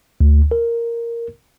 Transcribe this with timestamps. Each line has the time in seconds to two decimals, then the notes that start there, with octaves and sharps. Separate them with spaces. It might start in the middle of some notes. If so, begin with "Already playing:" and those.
0.21 D2
0.51 A#4